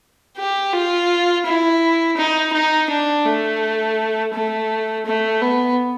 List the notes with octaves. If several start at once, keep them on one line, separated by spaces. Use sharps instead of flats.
G4
F4
E4
D#4
D#4
D4
A3
A3
A3
B3